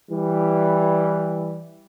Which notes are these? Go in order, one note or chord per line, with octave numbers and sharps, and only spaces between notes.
E3 G3